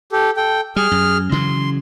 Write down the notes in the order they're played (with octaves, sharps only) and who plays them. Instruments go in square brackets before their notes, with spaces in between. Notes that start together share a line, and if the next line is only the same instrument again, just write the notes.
[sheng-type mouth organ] G4 A4
A4 G5
[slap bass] G3 [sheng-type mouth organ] G#4 F6
[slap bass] F#2
[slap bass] C#3 E3 F#3 [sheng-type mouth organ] C6